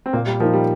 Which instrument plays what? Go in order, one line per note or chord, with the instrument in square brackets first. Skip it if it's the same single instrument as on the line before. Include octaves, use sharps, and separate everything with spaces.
[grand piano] C4
[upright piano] A#2 [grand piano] A#3
[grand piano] G3
[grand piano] F3 [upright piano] A#3 D#4
[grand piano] G3